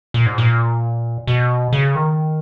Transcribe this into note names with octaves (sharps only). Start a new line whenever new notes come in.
A#2
G#2
A#2
B2
C#3
D#3